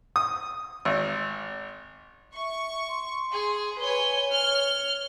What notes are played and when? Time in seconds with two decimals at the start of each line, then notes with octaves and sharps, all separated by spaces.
0.16 D#6
0.85 G#1
2.36 E5 C#6
2.88 C6
3.32 G#4
3.79 B4 C#5 G#5 G7
4.33 C#5 F6